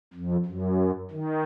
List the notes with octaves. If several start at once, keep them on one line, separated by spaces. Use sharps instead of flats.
F2
F#2
D#3